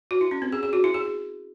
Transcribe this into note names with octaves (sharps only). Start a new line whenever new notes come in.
F#4
E4
C#4
C4
G#4
G#4
F#4
E4
G#4